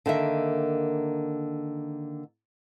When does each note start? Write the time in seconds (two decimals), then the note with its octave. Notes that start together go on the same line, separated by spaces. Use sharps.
0.06 D3 D#3 A#3 E5